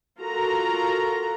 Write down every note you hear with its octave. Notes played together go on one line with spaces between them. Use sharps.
F4 F#4 A4 A#4 A#5